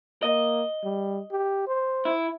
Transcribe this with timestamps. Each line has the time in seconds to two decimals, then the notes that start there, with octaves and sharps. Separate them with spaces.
0.23 A#3 D#5
0.84 G3
1.32 G4
1.67 C5
2.05 E4